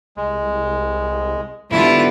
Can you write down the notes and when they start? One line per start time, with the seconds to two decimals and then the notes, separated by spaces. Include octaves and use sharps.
0.17 C2 G#3
1.71 G#2 D3 G3 B3 E4 F4